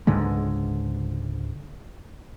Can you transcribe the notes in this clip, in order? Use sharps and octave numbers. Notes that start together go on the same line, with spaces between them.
C#2 G#2 D3 G#3